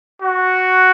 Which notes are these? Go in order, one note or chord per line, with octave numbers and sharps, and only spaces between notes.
F#4